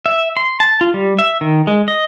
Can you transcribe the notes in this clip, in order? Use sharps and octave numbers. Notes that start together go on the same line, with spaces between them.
E5
C6
A5
F4
G3
E5
D#3
G#3
D#5